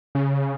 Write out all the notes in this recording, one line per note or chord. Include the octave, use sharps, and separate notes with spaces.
C#3